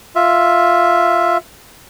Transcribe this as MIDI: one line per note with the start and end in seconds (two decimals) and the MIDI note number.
0.16 1.37 65
0.16 1.37 76